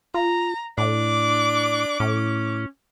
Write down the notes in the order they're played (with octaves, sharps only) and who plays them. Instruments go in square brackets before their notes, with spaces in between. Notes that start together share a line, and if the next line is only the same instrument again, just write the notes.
[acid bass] F4 [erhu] A#5
[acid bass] A2 [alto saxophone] D4 [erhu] D6
[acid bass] A2 [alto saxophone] C#4